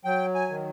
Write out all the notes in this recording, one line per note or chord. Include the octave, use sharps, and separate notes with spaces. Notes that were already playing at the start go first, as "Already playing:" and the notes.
F#3 G5
G#5
D#3